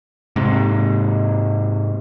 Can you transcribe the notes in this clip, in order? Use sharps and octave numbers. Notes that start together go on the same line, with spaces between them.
G#2 C3